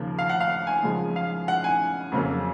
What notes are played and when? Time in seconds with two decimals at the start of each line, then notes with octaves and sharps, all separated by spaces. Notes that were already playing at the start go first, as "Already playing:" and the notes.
Already playing: D#2 C#3 F3 A#3
0.19 F5
0.29 F#5
0.40 F5
0.67 G#5
0.83 F#2 C#3 F3 G#3
1.16 F5
1.48 F#5
1.64 G#5
2.12 F2 C#3 F#3 A#3